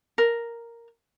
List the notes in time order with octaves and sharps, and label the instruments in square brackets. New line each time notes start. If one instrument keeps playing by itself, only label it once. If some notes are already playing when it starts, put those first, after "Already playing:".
[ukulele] A#4